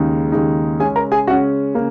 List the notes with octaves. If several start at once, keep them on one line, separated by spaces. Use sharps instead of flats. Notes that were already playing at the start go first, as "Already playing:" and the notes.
Already playing: D#2 C#3 G#3 D#4
D#2 C#3 G#3 D#4
C#3 G#3 C#4 G#4 G#5
A#4 A#5
G#4 G#5
C#3 G#3 C#4 F#4 F#5
C#3 A#3